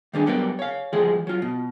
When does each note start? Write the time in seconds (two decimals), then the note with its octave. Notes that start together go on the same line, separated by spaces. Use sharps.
0.13 D#3 G3 D4 G#4
0.26 F#3 G3 B3 A#4 D5
0.59 C#5 F5
0.93 E3 F3 G3 G#3 G#4
1.27 F#3 F4
1.42 B2